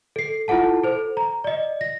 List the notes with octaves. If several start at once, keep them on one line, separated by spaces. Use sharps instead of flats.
A4 C7
E4 F4 A4 F#5 A5
A4 C5
A#5
D5 D#5
A#6